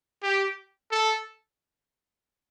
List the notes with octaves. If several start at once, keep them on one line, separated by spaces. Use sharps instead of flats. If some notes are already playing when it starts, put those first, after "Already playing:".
G4
A4